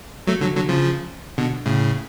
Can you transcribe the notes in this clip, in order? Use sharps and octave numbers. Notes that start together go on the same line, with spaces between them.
F#3 A3
D3 F#3
D3 F#3
C#3 F3
B2 D3
A2 C#3